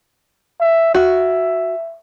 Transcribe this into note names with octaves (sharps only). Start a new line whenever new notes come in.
E5
F#4 E5